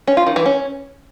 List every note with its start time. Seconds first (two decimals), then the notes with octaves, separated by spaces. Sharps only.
0.07 C#4
0.17 F4
0.27 D#3
0.36 E3
0.46 C#4